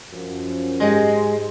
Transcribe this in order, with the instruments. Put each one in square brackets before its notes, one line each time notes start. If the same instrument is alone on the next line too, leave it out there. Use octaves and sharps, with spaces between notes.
[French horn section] F#2 F3
[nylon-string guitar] G#2 G4 D#5 [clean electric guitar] G#3